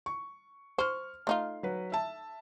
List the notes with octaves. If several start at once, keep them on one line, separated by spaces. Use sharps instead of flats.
C#6
C5 C#6 F6
A3 D#4 F4 C6
F#3 B4
E5 A5